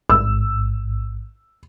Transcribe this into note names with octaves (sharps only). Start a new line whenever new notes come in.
A1 G#2 E6